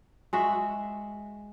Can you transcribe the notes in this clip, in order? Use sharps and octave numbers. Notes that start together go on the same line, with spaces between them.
G#3 F#4 E5